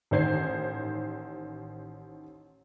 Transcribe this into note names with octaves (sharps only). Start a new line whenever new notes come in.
A1 D#3 C5 G#6 C7